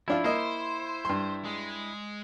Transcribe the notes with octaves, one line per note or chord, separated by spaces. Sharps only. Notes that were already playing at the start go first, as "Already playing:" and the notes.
F3 D4 E4 F4
A#3 C5 D#5
G2 C6
G#3